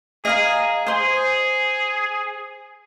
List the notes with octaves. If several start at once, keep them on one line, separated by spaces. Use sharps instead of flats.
G#4 D#5 F5 A#5
G#4 C5 C6